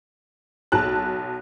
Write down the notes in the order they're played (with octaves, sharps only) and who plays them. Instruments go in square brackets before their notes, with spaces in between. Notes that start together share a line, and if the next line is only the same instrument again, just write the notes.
[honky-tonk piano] B1 A5 F#6